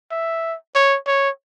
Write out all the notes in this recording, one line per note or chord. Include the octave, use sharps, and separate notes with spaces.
E5
C#5
C#5